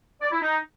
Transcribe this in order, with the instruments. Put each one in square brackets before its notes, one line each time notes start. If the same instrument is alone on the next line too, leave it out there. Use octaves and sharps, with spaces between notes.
[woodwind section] D5
E4
D#4